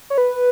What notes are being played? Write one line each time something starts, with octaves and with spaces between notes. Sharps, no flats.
C#5
B4